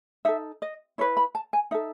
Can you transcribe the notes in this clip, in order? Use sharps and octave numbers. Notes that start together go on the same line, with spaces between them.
D#4 A4 E5
D#5
E4 B4 C#5
B5
A5
G#5
D#4 A4 E5